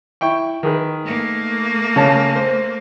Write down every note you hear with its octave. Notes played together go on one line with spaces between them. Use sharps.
E4 G5 C#6
D#3 G#4 B4
A3 A#3
C#3 C#5 A5
C5